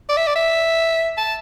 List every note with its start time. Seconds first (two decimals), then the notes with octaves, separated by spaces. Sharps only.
0.09 D5
0.17 E5
0.27 D5
0.36 E5
1.18 A5